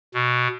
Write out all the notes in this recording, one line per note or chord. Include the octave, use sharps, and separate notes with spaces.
B2